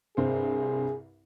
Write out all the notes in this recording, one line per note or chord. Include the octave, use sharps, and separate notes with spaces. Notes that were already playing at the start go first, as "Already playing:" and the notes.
C2 G2 C4 G#4